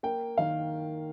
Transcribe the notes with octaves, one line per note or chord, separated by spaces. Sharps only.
A#3 G5
D#3 F5